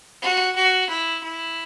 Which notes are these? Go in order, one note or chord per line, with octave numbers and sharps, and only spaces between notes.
F#4
F#4
E4
E4